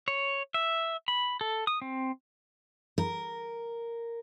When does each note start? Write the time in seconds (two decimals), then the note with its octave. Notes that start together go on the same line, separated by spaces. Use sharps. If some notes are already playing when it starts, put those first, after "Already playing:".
0.08 C#5
0.54 E5
1.08 B5
1.41 A4
1.67 D#6
1.82 C4
2.98 A#4